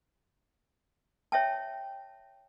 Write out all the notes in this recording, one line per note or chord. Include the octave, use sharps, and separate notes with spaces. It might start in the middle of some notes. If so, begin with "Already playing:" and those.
C#5 E5 G5 A5